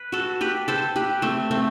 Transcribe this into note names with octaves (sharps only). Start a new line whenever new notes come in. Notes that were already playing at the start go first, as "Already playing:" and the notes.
Already playing: B4
F#4 A4
G4 B4
A4 C5
G4 B4
A3 C4
A3 C4